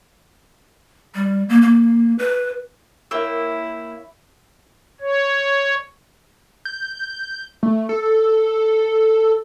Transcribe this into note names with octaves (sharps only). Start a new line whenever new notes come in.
G3
A#3
A#3
B4
A#3 E4 C#5 E5 G5 E6
C#5
G6
A3
A4